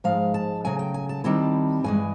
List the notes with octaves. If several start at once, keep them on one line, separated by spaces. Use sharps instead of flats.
G#2 F3 G#3 F5
A5
C#3 F#3 A3 G#5
G5
G#5
A5
D#3 G3 C4 E4 A5
G2 E3 G#3 G#5